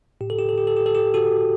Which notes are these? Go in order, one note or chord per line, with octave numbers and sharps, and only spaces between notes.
A2 G4
A4
G4
A4
G4
A4
G4
A4
G4
F#4 A4